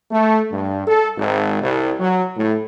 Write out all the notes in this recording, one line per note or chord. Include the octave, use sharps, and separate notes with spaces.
A3
G2
A4
G#1
C2
F#3
A2